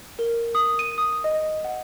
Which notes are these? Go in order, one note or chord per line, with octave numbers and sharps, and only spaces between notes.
A#4
D#6
D#7
D#6
D#5
F#5